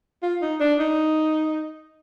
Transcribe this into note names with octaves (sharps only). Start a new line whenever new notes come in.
F4
D#4
D4
D#4